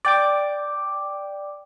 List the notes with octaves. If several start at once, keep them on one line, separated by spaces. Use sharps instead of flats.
D5 G5 D6